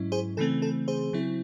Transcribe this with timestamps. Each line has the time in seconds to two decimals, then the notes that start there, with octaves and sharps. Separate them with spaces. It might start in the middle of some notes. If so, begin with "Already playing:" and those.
Already playing: G#2 F#3 C#4 E4
0.12 G#4 C5
0.37 C#3 E3 A3 C4 A4
0.62 A4
0.88 G#4 C5
1.13 C#3 F#3 C4 E4